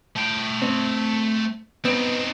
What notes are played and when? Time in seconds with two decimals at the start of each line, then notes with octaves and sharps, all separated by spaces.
0.16 A3 G5
0.62 C4
1.85 B3 C4 D#4